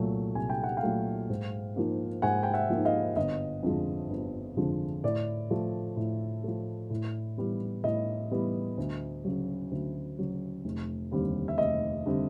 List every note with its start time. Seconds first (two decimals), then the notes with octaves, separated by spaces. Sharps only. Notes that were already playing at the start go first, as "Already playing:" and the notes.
Already playing: C2 A#2 F#3 A3
0.35 C2 G#5
0.50 G5
0.63 F#5
0.77 F5 G5
0.83 A#2 F#3 A3
1.29 G#2
1.76 F3 A#3 D#4
2.22 G#2 F#5 G#5
2.43 G5
2.54 E5 F#5
2.70 F3 A#3 D#4
2.85 D#5 F5
3.16 G1 D#5
3.63 F2 D3 F3 G#3
4.10 G1
4.57 F2 D3 F3 G#3
5.04 A2 D5
5.50 F3 A3
5.96 A2
6.44 F3 A3
6.90 A2
7.37 E3 G3 B3
7.84 A2 D#5
8.31 E3 G3 B3
8.78 D2
9.25 C#3 F#3
9.71 D2
10.18 C#3 F#3
10.65 F1
11.11 D#2 D3 G3 C4
11.48 E5
11.58 F1 D#5
12.06 D3 G3 C4